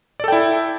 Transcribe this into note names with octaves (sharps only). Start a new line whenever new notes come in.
E4 A4 D5 G5